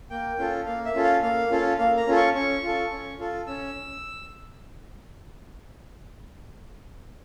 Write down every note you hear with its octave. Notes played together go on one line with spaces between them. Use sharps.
A#3 G5
C#4 F4 A4
A#3 F5
E5
C#4 F4 A4
F5
A#3 F5
C#4 F4 A4
A#3 F5
A#5
C#4 F4 A4
C#6
C#4 C#6
F4 A4
C#4
F4 A4
C#4 E6